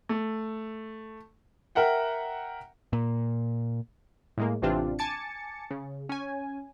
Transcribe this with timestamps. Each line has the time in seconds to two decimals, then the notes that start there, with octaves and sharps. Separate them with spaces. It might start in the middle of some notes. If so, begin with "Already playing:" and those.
0.09 A3
1.75 A#4 E5 F#5 G5
2.93 A#2
4.38 A2 G#3 A#3
4.62 A1 C3 E3 C4 D4 F4
4.99 G#5 A5 D6 A6 C#7
5.70 C#3
6.09 C#4 G#5